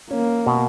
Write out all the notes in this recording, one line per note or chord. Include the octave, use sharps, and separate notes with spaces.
A#3 C#4
B2